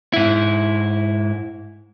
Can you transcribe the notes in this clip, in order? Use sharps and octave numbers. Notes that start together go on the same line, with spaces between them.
G#2 E4